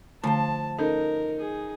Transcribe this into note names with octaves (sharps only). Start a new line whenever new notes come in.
D3 F3 A3 C5 A5 A#5
C#4 D#4 A4 A#4
G#4